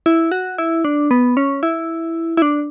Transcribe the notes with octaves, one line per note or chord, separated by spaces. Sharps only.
E4
F#4
E4
D4
B3
C#4
E4
E4
D4